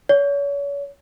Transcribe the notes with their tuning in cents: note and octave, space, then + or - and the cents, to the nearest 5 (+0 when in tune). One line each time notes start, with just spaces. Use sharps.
C#5 +35